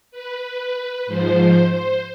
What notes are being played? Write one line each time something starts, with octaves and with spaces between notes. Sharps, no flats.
B4
B4
G#2 F3 C5
C5